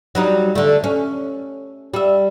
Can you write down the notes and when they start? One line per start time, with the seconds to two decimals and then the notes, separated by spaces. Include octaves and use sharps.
0.15 F#3 G3 D#4
0.55 D3 A3
0.84 C#4
1.94 G3 E5